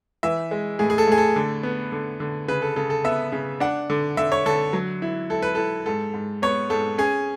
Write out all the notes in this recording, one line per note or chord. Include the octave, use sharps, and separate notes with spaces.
E3 E5
G#3
A2 G#4
G#4
A4
A2 G#4
A4
D3
B3
D3
D3
C#3 B4
A4
C#3 A4
A4
B3 E5
C#3
D4 F#5
D3
D3 E5
C#5
D3 A4
F#3
E4
E4 A4
B4
E4 A4
G#2 A4
G#2
B3 C#5
G#2 A4
C#4 G#4